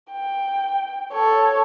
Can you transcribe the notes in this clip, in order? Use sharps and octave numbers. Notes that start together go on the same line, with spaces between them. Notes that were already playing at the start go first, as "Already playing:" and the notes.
G5
A4 C#5